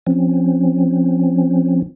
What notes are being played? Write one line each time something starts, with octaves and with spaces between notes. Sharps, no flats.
F3 C4 C#4